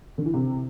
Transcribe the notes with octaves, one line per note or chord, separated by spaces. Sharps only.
D3
E3
C3